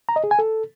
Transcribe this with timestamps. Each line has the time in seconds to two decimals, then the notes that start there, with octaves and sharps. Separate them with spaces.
0.09 A#5
0.16 D#5
0.24 G#4
0.31 G#5
0.39 A4